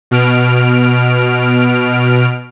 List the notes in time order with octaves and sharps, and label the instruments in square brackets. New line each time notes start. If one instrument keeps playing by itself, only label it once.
[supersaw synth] B2 F6 D7